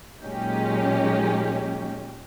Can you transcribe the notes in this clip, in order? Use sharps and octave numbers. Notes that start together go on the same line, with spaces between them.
A#2 F#3 G#3 C#4 D#4 G4